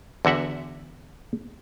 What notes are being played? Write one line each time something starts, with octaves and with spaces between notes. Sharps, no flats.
E2 D3 F#4 E5 F#5